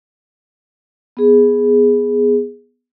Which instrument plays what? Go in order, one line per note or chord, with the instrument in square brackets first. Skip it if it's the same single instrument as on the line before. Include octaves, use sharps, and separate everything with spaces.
[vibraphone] B3 G#4